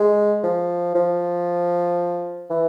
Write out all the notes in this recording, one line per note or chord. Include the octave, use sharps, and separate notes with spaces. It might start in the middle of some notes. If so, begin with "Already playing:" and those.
Already playing: G#3
F3
F3
E3